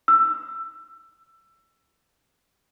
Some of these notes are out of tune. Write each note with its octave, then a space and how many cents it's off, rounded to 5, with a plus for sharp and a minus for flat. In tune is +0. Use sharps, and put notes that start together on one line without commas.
E6 +20